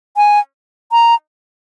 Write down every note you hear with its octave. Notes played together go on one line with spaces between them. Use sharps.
G#5
A#5